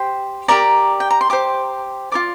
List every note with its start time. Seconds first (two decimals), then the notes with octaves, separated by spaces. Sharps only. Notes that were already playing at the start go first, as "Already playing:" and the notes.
Already playing: G4 C5 G5
0.48 G4 A#4 D5 A#5
1.00 G5
1.11 A#5
1.21 C6
1.30 G4 C5 D6
2.12 F4 A#4 D5 D6